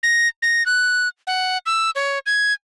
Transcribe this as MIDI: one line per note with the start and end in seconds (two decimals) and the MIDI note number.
0.03 0.28 94
0.42 0.65 94
0.66 1.08 90
1.27 1.58 78
1.66 1.90 88
1.95 2.19 73
2.26 2.53 92